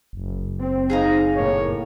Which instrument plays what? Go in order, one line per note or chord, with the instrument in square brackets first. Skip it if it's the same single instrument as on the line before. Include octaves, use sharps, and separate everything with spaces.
[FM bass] F#1
[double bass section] C4
[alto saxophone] D#4 [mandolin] G#4 F5 A#5
[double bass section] A2 A#3 [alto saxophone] C#5